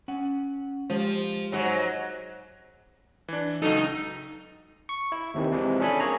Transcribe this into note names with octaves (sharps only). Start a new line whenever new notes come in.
C#4 F#5
F3 G#3 G4 C5
G#2 F#3
E3 D4
C#2 F#3 D#4 A4
C#6
E4
D#2 C3 D#3 E3
C3 E3 F3 G#3
C#4 D4 G#4 A4 G#5 B5
A#3 G#4 C#5 A#5